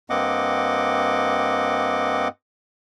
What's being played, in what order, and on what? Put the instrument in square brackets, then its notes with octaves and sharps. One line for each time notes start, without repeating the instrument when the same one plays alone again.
[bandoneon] G2 A#3 C4 D#5 F#5 D6